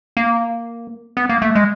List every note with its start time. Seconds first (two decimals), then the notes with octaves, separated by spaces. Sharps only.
0.17 A#3
1.17 B3
1.29 A#3
1.42 A3
1.55 G#3